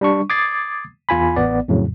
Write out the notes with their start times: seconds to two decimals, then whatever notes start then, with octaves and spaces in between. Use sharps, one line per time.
0.01 G3 D4 C#6
0.30 D6 D#6 G#6 A6 C7
1.09 E2 F4 G#5 B5
1.36 A1 B3 D5
1.68 F2 A2 C#3 F#3